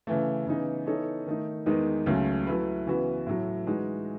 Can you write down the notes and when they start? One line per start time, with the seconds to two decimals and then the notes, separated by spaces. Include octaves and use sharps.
0.07 C#3 E3 A3
0.46 C#3 E3 B3 D#4
0.87 E3 B3 D#4 A4 C#5
1.27 D#3 A3 D#4
1.66 E2 D#3 G#3 B3 D#4
2.06 C#2 C#3 F#3 A3 C#4
2.47 F#3 A3 E4 B4
2.86 C#3 E3 B3 F#4 B4
3.27 A2 F#3 A3
3.66 E3 G#3 D#4 F#4